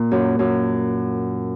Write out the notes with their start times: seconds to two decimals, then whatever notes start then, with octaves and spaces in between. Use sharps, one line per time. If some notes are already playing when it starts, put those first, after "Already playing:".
Already playing: A#2
0.11 F#2
0.39 F#2